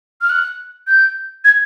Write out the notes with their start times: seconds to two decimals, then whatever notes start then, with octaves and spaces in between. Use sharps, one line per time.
0.21 F6
0.30 F#6
0.87 G6
1.45 G#6